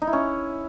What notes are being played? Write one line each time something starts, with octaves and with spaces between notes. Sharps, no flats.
D#4
E4
C#4